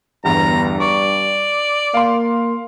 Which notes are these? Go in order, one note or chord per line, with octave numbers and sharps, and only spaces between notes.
G1 E2 G2 A#5
D5 C#6
A#3 F5 C6